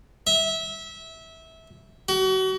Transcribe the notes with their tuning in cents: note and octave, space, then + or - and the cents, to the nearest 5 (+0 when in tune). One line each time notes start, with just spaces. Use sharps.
E5 -20
F#4 +35